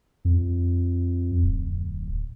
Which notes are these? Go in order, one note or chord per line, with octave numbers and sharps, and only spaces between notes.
F2
D1